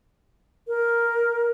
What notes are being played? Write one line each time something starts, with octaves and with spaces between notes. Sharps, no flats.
A#4